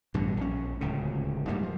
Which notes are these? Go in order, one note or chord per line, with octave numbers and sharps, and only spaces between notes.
A1 G2 B2 D3
A#1 C#4
D1 C#2 C#3
D2 G#2 G3 A#3
F3